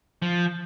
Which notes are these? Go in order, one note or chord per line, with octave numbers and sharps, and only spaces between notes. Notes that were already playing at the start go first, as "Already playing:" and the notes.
F3